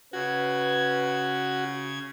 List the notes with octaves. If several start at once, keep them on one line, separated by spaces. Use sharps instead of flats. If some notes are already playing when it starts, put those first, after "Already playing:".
C#3 F#4 B4 G#6